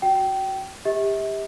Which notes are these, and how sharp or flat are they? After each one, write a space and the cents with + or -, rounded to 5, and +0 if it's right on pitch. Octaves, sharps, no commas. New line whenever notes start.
F#4 +0 G5 -25
G4 +25 E5 -40